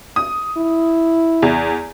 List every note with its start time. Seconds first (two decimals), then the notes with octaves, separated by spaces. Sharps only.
0.16 D#6
0.57 E4
1.42 E2